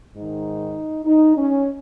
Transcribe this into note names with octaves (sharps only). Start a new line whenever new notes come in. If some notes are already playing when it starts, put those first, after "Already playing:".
G#2 D#3 D#4
D#4
C#4